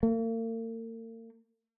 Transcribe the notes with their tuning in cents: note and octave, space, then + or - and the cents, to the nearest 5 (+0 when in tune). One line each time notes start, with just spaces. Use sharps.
A#3 -45